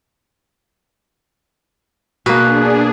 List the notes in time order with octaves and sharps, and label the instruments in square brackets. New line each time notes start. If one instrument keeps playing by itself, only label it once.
[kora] B2 A#3 [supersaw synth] D4 G#4 [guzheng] B4